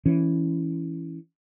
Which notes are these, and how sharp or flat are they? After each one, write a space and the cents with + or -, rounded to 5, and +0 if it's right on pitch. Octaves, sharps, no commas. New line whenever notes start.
E3 +0 C#4 +0